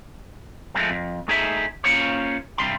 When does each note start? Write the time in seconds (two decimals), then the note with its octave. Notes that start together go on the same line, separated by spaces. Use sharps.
0.75 F3 F#3 G#3 A3 C4
0.90 F2
1.28 A3 D#4 G#4 C5 D#5 E5
1.84 A#3 C#4 F4 C5 C#5
2.58 G2 C3 G3 C6